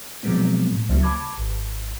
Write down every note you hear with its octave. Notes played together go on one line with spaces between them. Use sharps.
B2 F3 F#3 G#3 B3 C4
A2
C#2 C#3 F#3 G3 A#3
A5 B5 D6 G#6
G#1